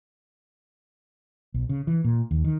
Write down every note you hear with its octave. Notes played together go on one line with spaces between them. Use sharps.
B1
C#3
E3
A#2
D#2
D#3